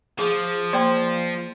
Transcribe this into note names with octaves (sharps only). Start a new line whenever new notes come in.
F3 G#4
A#3 C5 D5 G5 C6